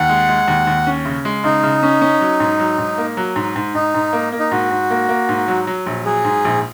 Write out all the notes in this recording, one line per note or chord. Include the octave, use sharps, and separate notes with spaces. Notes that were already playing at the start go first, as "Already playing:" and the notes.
Already playing: D#2 F#5
G#3
G#3
D#2
D#2
C#4
C#3
G#3
C#3 D#4
C#3
C#4
C#4
F#3
G#2
F#3
G#2
A#3
F#3
G#2
G#2
G#2 D#4
G#2
A#3
A#3
D#4
G#2 F#4
G#2
A#3
A#3
G#2
F#3
F#3
A#1
F#3 G#4
G#2
A#1